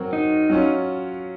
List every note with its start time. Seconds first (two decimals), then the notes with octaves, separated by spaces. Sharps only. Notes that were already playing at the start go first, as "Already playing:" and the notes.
Already playing: F#3 C4 F#4 A#4
0.13 D#4
0.50 F#3 C#4 F4